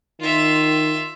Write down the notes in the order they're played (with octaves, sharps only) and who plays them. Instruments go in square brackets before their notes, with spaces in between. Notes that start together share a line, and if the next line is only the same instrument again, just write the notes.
[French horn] D#3 [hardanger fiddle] F4 E5